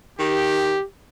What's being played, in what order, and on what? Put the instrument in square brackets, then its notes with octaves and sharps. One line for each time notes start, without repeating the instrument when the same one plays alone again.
[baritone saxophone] D#3 [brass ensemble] G4